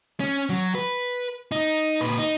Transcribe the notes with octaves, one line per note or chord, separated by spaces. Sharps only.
C#4
F#3
B4
D#4
A#2 B4
D#4